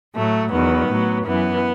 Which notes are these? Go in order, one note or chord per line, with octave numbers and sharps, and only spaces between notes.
A2 F#3 A3
E2 D#3 F#3 B3
A2 F#3
F#2 E3 B3